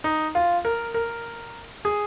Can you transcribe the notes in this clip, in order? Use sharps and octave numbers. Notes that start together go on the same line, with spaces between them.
D#4
F4
A#4
A#4
G#4